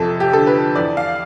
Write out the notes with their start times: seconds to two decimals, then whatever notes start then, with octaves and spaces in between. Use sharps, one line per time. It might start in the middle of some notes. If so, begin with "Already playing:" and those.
Already playing: F2 C3 A4
0.20 G4
0.32 D3 A4
0.47 B4
0.75 E2 D5
0.97 F5